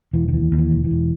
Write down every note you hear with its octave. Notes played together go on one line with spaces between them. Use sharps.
E1 E3
D#3
D#2 E3
D#2
E3
E1
E3
E1